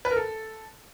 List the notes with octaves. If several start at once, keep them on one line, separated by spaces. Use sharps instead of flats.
B4
A#4
A4